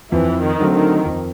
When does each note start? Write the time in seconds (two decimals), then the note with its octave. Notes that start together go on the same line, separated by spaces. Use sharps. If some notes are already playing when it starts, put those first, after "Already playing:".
0.12 F2 E3
0.43 D#3
0.59 D3 F#3 A3 C4
0.75 D#3
1.05 F2